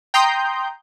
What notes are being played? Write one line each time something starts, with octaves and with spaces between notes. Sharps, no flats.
G5 A#5 C6 D#6 G6